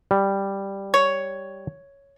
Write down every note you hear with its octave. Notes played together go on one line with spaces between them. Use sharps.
G3
C#5